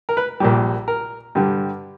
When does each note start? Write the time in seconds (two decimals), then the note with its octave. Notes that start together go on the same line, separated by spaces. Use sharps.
0.09 A#4
0.17 B4
0.40 A#1 A#2 G3
0.88 A#4
1.35 G2 D3 G3